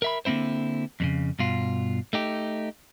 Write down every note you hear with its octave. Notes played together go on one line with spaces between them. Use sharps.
A#4 E5 B5
D3 A#3 C4 E4 C5
F2 A#2 C#3
G2 B2 F4
A3 D#4 G4